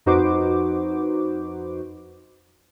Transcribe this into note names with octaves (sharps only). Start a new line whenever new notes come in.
F2 D#4 F#4 B4 C5 D6